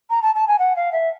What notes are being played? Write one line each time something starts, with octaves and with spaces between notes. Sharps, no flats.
A#5
A5
A5
G#5
F#5
F5
E5